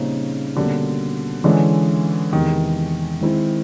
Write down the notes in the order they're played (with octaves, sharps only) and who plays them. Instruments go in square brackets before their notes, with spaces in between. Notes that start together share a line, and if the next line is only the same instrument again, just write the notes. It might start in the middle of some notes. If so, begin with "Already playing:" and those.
Already playing: [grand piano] A#2 G3 C4 D#4 [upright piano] C#3
[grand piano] B2 G3 A#3 C#4 [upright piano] D3
[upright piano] D3 [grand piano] E3 G#3 C#4
[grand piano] E2 C3 E3 G#3 B3 [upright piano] D#3
[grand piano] D#3 G#3 C4 E4